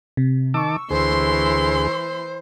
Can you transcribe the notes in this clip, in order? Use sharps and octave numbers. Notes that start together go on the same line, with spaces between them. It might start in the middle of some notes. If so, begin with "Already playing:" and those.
C3
D#3 A5 C#6 D6 E6
D2 E3 G#4 C5 C6